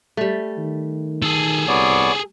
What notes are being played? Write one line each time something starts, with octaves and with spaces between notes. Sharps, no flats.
G3 A3
D#3
G#4 A4
C2 B3 C#5 D5